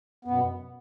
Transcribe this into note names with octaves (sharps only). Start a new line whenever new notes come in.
F#2 B2 B3